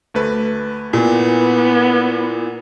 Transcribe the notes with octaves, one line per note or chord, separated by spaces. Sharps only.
D2 A3 B4
A#2 B3 E4